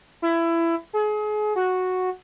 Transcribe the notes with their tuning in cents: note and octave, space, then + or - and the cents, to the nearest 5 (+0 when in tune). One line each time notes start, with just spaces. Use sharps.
E4 +20
G#4 +35
F#4 -5